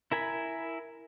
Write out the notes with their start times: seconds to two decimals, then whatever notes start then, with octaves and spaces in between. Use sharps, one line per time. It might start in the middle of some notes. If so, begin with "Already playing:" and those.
0.12 E4 A#4 G#5 B5